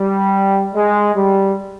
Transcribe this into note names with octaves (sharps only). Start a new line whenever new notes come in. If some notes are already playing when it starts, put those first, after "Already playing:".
Already playing: G3
G#3
G3